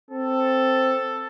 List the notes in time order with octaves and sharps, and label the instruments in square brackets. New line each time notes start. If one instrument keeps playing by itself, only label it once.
[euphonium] C4 [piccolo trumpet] A4